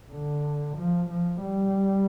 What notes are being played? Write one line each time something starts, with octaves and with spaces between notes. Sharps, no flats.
D3
F3
F3
G3